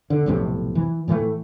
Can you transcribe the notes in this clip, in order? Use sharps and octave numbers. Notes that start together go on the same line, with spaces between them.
D3
B1 F2 A2 C3
E3
A2 E3 G3 A3